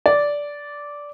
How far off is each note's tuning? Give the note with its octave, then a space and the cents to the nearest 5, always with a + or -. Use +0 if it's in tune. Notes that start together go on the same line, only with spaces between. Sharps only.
D5 -10